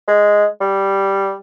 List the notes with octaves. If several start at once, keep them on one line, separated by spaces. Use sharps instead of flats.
G#3
G3